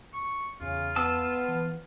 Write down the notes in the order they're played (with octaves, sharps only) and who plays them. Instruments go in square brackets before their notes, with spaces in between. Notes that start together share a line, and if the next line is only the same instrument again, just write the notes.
[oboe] C#6
[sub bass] E2 [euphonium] C#3 [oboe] F4
[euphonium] B3 [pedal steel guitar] A5 E6
[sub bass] E3